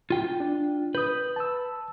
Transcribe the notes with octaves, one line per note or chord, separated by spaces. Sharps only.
F4 G5
D4
B4 D#6 G6
A5 E6